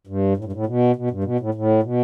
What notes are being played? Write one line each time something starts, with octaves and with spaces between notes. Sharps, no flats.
G2
A2
G2
A2
B2
B2
G2
B2
A2
A2
B2